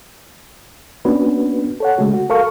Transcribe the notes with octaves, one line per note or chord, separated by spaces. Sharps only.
A#3 B3 C#4 D4 F#4 B4
A4 C#5 F#5
C#3 G#3 A3 F#4
F#4
A4 A#4 F5 C#6